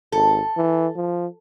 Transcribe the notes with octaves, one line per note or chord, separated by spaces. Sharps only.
G#1 A4
E3
F3